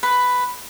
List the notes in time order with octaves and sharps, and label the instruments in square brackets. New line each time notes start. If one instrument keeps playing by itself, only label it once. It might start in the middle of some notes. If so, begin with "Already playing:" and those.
[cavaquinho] B4